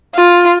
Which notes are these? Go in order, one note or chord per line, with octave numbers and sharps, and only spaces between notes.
F4